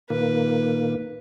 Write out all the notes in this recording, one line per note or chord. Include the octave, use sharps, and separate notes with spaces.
A#2 D#3 A#3 B4